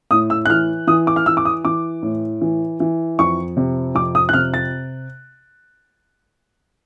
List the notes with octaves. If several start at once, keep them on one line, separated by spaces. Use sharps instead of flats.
A2 D#6
E6
F#6
E3 F6
E3 D#6
D6
F6
E3 E6
D6
D#6
E3 D6
A2
E3
E3
F2 C#6
C3
F2 D6
D#6
F#6
C3 F6
A6